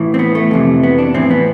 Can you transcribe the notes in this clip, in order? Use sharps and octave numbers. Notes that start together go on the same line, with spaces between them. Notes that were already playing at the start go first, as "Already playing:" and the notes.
Already playing: A2 E3
C4
B3
A3
F2 C3 E3
B3
D4
A2 E3 C4
B3